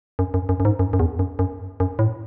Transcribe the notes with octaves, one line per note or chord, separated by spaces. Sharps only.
F#2
F#2
F#2
F#2
G#2
F#2
F#2
E2
F#2
F#2
F#2
A2